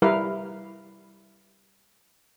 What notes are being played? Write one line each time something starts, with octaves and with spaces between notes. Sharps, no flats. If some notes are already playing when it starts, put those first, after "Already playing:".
G3 E4 A#4 B4 F5